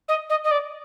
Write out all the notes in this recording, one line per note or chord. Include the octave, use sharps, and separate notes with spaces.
D#5
D#5
D#5
D5